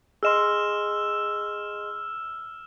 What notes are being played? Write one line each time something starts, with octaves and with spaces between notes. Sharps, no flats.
G#4 D#5 C6 E6 F6 E7